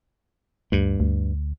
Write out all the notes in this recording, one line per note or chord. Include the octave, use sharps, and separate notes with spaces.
D2 G2
D2